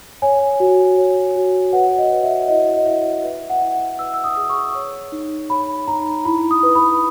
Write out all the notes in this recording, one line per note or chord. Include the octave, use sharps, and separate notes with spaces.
C#5 G#5
F#4
C#5
F#4
B4 F#5
D#5
B4
E5
E4 D#5
D#5
E4 E5
B4 E5
F#5
E4
F#5
B4 E6
E6
D#6
G#4
C#6
C#5
D#4
C#5 B5
D#4 A#5
E4 B5
D#6
B4
B5